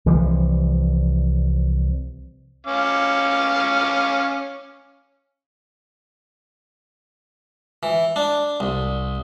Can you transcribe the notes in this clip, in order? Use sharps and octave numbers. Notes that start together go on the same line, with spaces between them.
C2 E3 F3 G3
C#4 F5 D6
E3
D4
C2